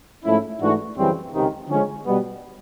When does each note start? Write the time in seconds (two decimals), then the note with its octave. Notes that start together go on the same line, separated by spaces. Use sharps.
0.25 G#2 F3 A3 C#4 E4
0.61 G#2 E3 A3 D4 F#4
0.97 F#2 C#3 E3 G3 C4
1.33 C#2 C3 D#3
1.69 D3 F3 G#3 C#4
2.05 B2 G3 B3